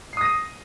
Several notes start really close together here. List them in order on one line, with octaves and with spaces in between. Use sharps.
C7 D#6 A#6 D#7